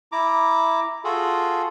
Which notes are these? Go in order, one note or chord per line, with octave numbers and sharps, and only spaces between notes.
E4 A#5 D6
F4 F#4 G#4 A4